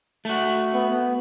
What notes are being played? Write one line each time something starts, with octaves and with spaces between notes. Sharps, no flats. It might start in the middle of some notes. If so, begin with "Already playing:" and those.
A3 F#4
B3